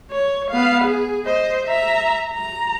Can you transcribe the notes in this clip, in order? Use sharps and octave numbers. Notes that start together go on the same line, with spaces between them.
C#5
B3 F5
G#4
C5 D#5
E5 A#5
A#5